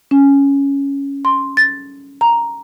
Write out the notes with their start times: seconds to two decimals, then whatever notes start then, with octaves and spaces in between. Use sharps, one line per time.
0.11 C#4
1.25 C6
1.57 A6
2.21 A#5